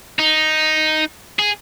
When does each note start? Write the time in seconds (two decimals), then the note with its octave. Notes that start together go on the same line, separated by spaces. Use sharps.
0.19 D#4
1.39 G#4